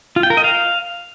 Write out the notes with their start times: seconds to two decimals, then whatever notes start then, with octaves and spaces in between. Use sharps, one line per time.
0.16 F4
0.23 G5
0.30 A#4
0.37 D#5
0.44 F5